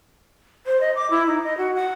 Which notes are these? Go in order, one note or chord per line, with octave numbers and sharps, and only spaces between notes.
C5
D#5
D6
E4
D#4
D#5
F#4
F#5